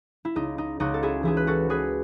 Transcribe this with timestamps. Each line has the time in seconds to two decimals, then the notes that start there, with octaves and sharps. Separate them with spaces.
0.25 E4
0.35 C#2 D#4
0.58 D#4
0.80 C#2 D#4 F#4
0.94 A4
1.03 E4 G#4
1.23 E3 E4 G#4
1.37 B4
1.47 F#4 A4
1.70 E3 G#4 B4